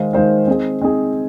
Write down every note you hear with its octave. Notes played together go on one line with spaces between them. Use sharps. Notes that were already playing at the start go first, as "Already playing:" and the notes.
Already playing: D#3 G#3 D#4 C5 F5
D#3 G#3 D#4 C5 F5
C4 D#4 G#4
C4 D#4 G#4